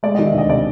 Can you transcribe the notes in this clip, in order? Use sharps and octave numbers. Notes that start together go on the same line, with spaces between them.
G#3 D5
D#3 D#5
E5
D2 D#5
C3 D5